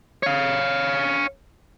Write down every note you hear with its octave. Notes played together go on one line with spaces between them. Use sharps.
C#5 F5